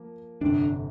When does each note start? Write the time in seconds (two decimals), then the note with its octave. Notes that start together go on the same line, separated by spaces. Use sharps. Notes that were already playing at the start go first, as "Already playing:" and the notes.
Already playing: F3 A#3
0.41 G1 F2 C3 D4